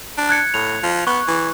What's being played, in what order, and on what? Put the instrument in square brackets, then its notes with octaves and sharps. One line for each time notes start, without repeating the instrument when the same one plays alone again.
[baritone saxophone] D4
[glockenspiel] F#6 G#6 C#7
[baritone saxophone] A2 [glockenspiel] F7
[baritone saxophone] F3
[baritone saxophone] B3 [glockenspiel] C#6 F#6
[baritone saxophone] E3